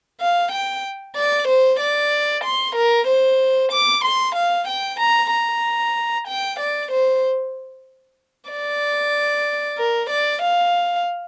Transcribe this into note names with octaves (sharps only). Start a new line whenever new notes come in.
F5
G5
D5
C5
D5
C6
A#4
C5
D6
C6
F5
G5
A#5
A#5
G5
D5
C5
D5
A#4
D5
F5